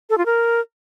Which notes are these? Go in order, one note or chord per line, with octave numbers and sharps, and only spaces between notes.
A4
F4
A#4